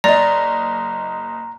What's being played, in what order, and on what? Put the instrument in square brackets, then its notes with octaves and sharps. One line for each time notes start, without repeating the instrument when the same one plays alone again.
[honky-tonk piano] F#1 D#5 [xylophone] D5 [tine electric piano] A#5